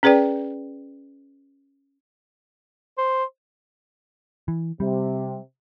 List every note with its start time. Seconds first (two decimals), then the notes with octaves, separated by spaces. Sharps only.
0.03 C#4 G#4 B4 D5 G5
2.98 C5
4.48 E3
4.80 C3 G3